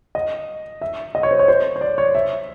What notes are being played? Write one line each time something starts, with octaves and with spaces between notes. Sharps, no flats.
D#5
E5
D#5
C#5
C5
C#5
C5
C#5
D5
C#5
E5